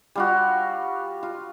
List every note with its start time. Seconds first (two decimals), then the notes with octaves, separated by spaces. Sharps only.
0.16 G3 F4 F#4
1.23 F4